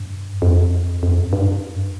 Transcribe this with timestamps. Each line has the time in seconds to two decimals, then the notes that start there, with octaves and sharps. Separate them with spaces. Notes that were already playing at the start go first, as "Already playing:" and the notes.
Already playing: G2
0.42 F2
1.03 F2
1.18 F#2
1.33 G2
1.41 G#2
1.47 G2
1.67 F#2